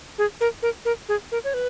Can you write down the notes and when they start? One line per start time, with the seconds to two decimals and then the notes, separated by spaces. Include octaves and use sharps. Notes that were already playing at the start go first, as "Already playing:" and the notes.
0.18 G#4
0.41 A#4
0.63 A#4
0.85 A#4
1.09 G#4
1.32 A#4
1.44 C#5
1.54 B4